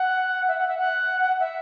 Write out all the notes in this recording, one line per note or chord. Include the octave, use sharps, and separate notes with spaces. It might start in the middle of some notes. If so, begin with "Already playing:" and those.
Already playing: F#5
E5
F#5
E5
F#5
E5